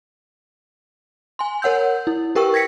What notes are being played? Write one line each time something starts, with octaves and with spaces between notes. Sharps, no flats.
G#5 C6
A#4 C#5 F#5 E6 G6
E4
G4 A#4 B4 G5 C#6 E6
G#6 A#6 B6 C#7